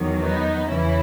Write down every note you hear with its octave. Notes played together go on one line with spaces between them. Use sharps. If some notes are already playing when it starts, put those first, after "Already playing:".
Already playing: E2 D#3 F#3
B3 D#4
E2 C#3 E3 C#4 E4